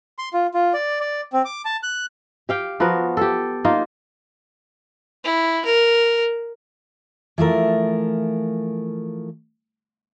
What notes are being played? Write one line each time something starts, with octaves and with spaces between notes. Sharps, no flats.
C6
F4
F4
D5
D5
C4
D6
A5
F#6
G4 F5 G5
F3 B3 F#4 A#4
G4 A4
A#3 D#4 F4
E4
A#4
E3 F3 A3 A#4